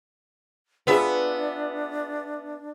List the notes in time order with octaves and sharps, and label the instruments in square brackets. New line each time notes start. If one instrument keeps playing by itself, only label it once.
[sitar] B3 E5 [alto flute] D4 [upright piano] F4 G#4 B5